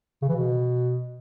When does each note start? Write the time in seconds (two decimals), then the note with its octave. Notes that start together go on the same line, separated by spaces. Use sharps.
0.22 C#3
0.29 E3
0.35 B2